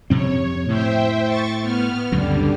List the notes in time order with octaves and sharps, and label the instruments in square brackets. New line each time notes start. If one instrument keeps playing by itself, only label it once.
[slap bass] F2 C3 C4 [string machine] C#5
[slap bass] A2 [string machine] C5 E5 G5
[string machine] C#6 A6
B3 F6
[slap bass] C#2 F#2 B2 [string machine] D3 G3